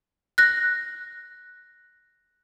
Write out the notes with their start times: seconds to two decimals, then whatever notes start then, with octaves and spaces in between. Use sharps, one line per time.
0.38 F#6 A#6